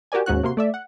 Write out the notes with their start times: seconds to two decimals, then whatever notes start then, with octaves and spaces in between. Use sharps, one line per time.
0.12 F#4 G4 A#4 D5 G#5
0.26 D#2 G#2 C#4 F#4 F#6
0.43 C3 A#3 F#4 C6
0.57 A3 D5 E5
0.74 F#5